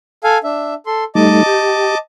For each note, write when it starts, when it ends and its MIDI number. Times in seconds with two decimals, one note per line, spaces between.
0.24 0.38 69
0.24 0.38 77
0.24 0.38 80
0.44 0.74 62
0.44 0.74 76
0.86 1.04 69
0.86 1.04 84
1.15 1.43 55
1.15 1.43 57
1.15 1.43 63
1.15 1.97 75
1.15 1.97 81
1.15 1.97 86
1.46 1.95 67